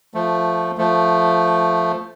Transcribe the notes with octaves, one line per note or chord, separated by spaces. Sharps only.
F3 A3
F3 A3